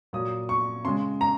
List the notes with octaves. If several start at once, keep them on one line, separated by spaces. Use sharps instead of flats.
A#2 F#3 D#6
C#6
C#3 G#3 C6
A#5